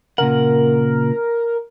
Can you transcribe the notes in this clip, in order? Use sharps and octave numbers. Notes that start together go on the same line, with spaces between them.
A#2 C#3 A#4 F#5